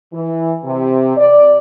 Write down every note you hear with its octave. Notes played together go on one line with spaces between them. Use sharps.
E3
C3
D5